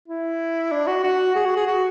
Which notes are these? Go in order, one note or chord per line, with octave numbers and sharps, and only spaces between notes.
E4
D4
F#4
F#4
G#4
F#4
G#4
F#4